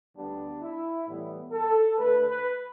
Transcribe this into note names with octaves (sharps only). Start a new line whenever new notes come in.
D2 D3 G3 B3 D4
E4
A2 E3 G3 B3
A4
D2 D3 A3 B4
B4